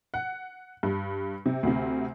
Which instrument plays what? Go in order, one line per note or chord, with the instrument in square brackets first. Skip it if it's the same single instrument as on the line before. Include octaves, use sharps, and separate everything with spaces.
[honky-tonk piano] F#5
G2
C3
D2 C3